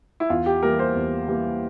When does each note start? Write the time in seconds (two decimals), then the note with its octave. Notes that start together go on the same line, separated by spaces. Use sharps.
0.20 E4
0.30 E2 F4
0.46 G4
0.62 E3 G3 A#3 A#4
0.79 C5
0.95 E2
1.28 E3 G3 A#3